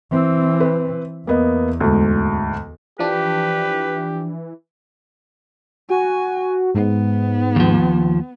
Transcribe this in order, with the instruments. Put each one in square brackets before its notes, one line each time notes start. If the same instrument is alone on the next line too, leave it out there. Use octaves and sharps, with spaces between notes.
[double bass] E3 C4
[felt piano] B4
[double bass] E2 [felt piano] A#3 B3 D#5
[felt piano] D2 G#2
[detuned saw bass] E3 [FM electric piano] F3 D4 [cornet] G4 [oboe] B4
[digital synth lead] F#4 [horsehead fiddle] G#5
[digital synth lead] G#2 [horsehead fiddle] B3
[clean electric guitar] D#2 F3